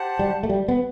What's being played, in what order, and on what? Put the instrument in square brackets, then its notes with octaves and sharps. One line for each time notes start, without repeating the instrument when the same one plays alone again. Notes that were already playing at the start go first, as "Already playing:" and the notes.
Already playing: [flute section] G4 C5 F#5 A5
[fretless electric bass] G3
A3
G3
B3